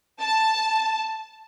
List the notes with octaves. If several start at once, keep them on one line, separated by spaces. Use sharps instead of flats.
A5